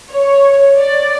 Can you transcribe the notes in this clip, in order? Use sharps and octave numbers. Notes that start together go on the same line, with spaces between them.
C#5
D5